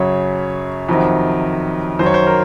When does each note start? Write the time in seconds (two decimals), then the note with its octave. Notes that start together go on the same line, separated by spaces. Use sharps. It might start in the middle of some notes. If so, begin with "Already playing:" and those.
Already playing: F#2 C#3 F#3 C#5
0.89 F2 C3 D#3 F#3
1.99 F#2 D#3 F#3 C5
2.06 C#5
2.14 C5
2.27 A#4